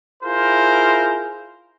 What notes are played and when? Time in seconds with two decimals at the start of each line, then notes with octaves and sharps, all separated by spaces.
0.23 E4 F4 G#4 A#4 C5